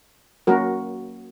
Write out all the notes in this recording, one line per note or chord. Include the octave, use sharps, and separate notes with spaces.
F#3 A#3 C#4 F#4 A#4